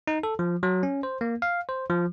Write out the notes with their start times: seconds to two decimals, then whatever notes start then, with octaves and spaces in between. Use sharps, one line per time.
0.07 D#4
0.23 A4
0.39 F3
0.63 F#3
0.83 C#4
1.03 C5
1.21 A#3
1.42 F5
1.69 C5
1.90 F3